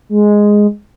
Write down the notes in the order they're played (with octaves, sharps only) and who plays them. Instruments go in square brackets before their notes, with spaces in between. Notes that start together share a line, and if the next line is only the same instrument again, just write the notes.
[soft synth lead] G#3